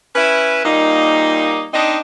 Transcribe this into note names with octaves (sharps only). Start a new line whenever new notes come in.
C#4 E4 B4
A#2 G3 A#3 D#4
C4 D4 D#4